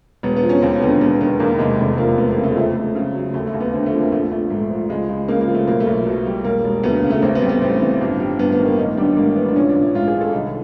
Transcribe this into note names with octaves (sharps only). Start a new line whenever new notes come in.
E1 B3
B3
F3
C#4
D#2 C4
D3 B3
E1 B3
D#3 B3
E2 A#3
C3 G#3
F1 A3
F3 A#3
F2 B3
A#3
C#3
A3
G#3
F2 A3
F2
C#3
F#3
D#2 A3
A3
D#2
B3
D3 C4
A3
F3
A#3
A#1 A3
A#1 A3
G#2 A3
F3
C#2 G#3
C#2
C#3 A#3
A#3
F3
A3
B1 A#3
A3
B1
B2
G3
E1 A#3
E1
D2 B3
C#3
A3
A1 C4
B3
G3
B3
A2 C4
E3
G1
G3
G2 B3
B3
D#3
A#3
A1 D#4
G3 D4
G#2 A#3
E3 B3
D4
A#1 C#4
D4
A#1
E4
G#2 F4
G#4
D#3
A4
C2 D#4